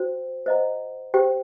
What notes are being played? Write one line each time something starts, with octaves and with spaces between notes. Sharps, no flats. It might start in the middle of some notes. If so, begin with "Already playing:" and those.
Already playing: F#4 C5 G5
C5 D#5 F#5 A#5
G4 C5 G5